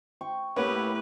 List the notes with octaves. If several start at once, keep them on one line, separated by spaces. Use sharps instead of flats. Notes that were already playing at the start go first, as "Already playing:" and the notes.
G5 C#6
A2 A#3 B3 C#4 G4 B4